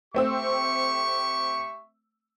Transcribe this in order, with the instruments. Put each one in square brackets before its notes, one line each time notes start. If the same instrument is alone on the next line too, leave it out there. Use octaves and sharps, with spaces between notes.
[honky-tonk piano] A3 C4 E6 [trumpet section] G4 E5 C#6